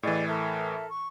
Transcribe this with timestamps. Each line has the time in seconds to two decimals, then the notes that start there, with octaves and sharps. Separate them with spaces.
0.03 A2 E3 G#4 D5 D#5
0.28 A4 A#4 E5
0.90 C#6